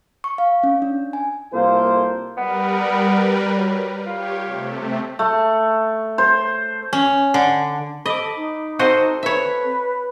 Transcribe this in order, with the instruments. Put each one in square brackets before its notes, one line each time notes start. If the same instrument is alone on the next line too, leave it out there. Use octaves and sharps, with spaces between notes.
[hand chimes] C#6
F5
C#4
D4
G#5
[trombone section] C2 A#3 F4 A4 C5
[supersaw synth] G3 A#4 B4 [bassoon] B3
[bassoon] F#3
[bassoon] F4 [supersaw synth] G4 C#5
[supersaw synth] C3 A3
[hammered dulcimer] A3
C5
[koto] C#4
D3
[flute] A4 [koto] D#5 [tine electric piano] B5 D6
[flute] D#4
[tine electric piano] C4 A4 [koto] F#4 C5 D#5
[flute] B4 [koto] C#5 E5